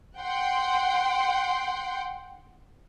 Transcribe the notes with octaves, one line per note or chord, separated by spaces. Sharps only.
F#5 G5 C6